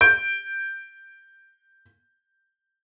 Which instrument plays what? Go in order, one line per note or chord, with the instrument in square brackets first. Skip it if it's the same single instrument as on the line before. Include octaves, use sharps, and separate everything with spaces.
[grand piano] G6 D7